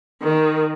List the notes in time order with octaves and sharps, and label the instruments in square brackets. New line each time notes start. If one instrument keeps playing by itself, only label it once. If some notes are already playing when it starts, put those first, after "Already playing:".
[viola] D#3